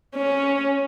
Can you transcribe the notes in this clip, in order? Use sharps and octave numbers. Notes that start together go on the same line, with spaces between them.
C#4